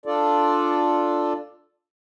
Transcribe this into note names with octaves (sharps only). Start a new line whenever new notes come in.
D4 F4 A4 D5